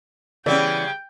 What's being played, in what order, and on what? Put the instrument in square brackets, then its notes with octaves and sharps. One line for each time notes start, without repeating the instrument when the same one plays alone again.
[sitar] C#3 G3 [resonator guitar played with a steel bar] E3 B3 C#4 [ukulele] D5 [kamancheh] G5